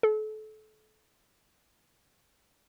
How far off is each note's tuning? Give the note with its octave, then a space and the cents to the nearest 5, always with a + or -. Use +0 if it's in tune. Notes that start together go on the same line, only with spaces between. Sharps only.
A4 -30